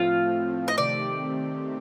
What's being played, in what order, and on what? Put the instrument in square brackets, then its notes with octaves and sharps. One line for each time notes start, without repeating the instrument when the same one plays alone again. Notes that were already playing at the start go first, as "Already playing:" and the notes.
Already playing: [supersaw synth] A2 F3 A3 C4 [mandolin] F4
[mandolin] D#5
[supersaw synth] C3 D#3 A3 C4 G4 [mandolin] D5